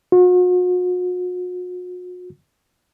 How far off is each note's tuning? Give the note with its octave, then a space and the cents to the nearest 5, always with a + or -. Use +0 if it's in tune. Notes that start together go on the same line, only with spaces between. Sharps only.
F#4 -45